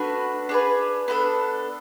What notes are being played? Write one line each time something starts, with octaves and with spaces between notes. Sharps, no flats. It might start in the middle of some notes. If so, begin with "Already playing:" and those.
Already playing: A3 D4 F#4 B4
D4 G#4 B4
B3 D4 A4